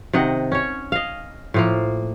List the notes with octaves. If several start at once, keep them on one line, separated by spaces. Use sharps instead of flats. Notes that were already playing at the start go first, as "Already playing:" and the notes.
C3 D#3 D#5 F#5
C#4 C#5
D#5 F5
A2 F3 A#3